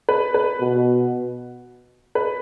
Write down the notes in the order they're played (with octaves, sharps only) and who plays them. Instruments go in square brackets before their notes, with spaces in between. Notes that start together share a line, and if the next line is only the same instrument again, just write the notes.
[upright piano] B4
B4
[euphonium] B2
[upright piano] B4